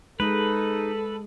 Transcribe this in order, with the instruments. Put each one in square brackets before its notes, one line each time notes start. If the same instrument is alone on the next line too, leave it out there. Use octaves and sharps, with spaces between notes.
[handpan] G#3 [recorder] D#4 [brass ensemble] A4 [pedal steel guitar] B4